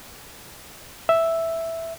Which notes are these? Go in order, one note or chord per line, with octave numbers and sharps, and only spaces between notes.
E5